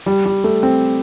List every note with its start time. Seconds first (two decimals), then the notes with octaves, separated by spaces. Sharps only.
0.06 G3
0.25 G3
0.44 A3
0.63 C4